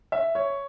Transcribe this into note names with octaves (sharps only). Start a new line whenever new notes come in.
E5
C#5